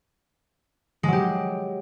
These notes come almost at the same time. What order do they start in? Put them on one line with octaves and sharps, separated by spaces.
G#3 F#3 G4